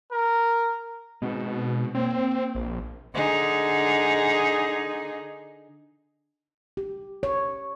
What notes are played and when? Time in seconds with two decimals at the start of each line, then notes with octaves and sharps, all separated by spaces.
0.12 A#4
1.22 B2 G#3 C4 D#4
1.95 A#3 C4 C#5
2.55 A#1
3.14 D3 D#4 G#4
6.77 G4
7.23 C#5